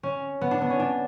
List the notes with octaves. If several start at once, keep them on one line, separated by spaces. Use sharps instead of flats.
C#4
B3
D4
B3
C#4
D4